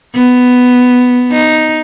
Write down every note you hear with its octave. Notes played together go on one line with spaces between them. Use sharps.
B3
D#4